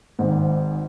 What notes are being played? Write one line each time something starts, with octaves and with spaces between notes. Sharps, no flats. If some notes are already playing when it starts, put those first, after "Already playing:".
G#1 G#2